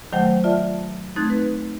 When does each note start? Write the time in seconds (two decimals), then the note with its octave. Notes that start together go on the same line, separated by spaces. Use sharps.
0.13 D#3 F#3 A3 C5 F#5 G5
0.44 F4 D5 E5 A5
1.16 A3 C4 D#4 F#6 G#6 A6
1.30 B4